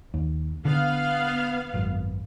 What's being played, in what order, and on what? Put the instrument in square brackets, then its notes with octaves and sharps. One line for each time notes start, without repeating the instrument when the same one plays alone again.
[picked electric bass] D#2
[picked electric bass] D3 [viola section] B3 F5
[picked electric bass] G#1 F#2